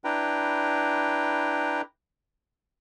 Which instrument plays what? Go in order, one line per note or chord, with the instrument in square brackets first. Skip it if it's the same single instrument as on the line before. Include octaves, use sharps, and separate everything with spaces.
[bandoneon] D4 E4 B4 G5 A#5